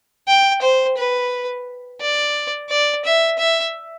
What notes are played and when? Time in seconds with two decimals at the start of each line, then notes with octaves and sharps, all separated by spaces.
0.28 G5
0.62 C5
0.98 B4
2.01 D5
2.70 D5
3.05 E5
3.39 E5